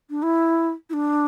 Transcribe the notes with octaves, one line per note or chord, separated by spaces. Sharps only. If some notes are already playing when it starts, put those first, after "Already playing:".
D4
E4
E4
D4